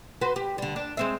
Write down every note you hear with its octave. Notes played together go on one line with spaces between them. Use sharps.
F#4 B4 C5
G4
D3 G3
D4
G#3 C4 E5